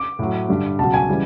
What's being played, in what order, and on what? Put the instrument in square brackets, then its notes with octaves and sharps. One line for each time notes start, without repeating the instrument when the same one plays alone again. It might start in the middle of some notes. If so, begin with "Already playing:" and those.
Already playing: [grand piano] D6
A2 F#3
G2 D3 G3
C#2 B2 F#3 A5
G#5
C#3 E3 G3